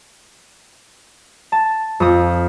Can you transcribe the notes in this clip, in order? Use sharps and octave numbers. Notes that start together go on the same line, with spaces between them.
A5
F2 D#6